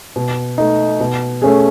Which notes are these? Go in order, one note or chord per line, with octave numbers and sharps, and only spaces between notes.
B2
A3 D#4
B2
A3 C#4 G#4